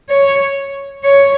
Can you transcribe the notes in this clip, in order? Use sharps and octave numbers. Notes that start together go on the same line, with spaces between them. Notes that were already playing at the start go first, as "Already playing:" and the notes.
C#5
C#5